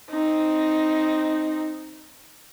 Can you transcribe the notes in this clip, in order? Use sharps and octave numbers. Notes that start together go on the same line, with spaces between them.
C4 D#4